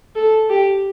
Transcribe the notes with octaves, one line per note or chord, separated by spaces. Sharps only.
A4
G4